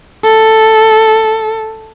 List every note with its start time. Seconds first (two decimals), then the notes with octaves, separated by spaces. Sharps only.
0.24 A4